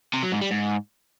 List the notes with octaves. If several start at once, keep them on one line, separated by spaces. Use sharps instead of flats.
C3
F#3
G#2
G3
G#2